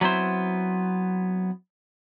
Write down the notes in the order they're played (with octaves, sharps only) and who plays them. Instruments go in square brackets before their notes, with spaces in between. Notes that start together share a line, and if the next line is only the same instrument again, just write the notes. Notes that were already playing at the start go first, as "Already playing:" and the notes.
[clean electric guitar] F#3 B3 C4 E4 C5